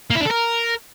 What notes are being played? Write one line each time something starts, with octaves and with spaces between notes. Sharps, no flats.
A#3
E4
D4
A4
A#4